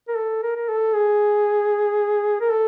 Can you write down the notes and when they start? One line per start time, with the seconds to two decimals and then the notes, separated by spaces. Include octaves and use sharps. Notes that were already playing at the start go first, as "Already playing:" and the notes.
0.08 A#4
0.16 A4
0.43 A#4
0.56 A#4
0.68 A4
0.94 G#4
2.40 A#4
2.51 A4